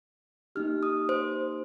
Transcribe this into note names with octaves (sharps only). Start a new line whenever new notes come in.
A#3 D#4 G4 F6
D#6
C5